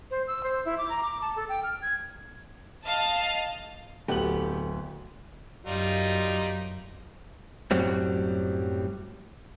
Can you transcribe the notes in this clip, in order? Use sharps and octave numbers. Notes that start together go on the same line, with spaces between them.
C5
E6
C5
E4
D6
A#5
D6
A5
A4
G5
F6
G#6
D#5 F5 A5
D1 A3 B3 G4 F#7
F#2 G3 D#4 F4
F#2 A2 F#3 G3 C4